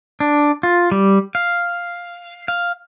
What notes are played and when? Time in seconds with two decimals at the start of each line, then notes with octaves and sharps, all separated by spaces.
0.20 D4
0.63 F4
0.92 G3
1.35 F5
2.48 F5